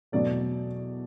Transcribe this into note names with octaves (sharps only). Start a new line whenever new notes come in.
E2 B2 F#3 A3 D5